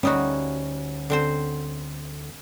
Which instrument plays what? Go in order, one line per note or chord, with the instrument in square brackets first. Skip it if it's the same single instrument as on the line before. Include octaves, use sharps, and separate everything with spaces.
[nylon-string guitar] D2 C#4 [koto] G3 D#4 F#4
[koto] D3 C4 C5